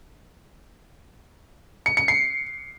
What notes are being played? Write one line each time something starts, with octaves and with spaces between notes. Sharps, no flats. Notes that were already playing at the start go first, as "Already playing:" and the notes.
C#7
C#7
C7